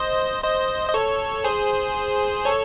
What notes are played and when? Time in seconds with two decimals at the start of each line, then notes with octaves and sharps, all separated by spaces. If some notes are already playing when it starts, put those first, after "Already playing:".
Already playing: C5 D#5
0.44 C5 D#5
0.89 D#5
0.94 A4 C#5
1.44 G#4 C5
2.45 A4 C#5